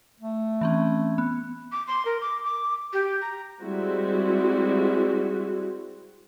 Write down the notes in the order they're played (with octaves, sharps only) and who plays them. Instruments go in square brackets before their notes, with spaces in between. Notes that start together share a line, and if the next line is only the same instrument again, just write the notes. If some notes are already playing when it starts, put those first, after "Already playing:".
[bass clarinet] A3
[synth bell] E3 C4 C#4
B3
[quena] D6
C6
A#4
D6
D6
G4
A#5
[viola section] G3 G#3 C4 E4 F#4